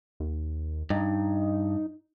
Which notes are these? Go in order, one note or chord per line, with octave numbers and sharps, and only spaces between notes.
D#2
G2 D#4